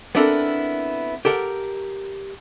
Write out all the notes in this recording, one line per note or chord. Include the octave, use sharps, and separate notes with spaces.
B3 C4 D4 E4 A4 A#4
G4 A4 A#4 F#5